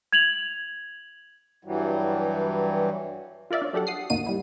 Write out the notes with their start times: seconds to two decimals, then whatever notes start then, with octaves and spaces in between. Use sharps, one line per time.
0.13 G#6 F7 F#7
1.65 G2 E3 F#3 G3
3.51 F4 A#4 D5 E5 F5
3.62 D4 C#5
3.73 F#3 D4 G4 A4 F#5
3.87 F#5 D#6 C7
4.10 G1 D#2 A#3 D#4 F#4 D#7
4.26 G3 E4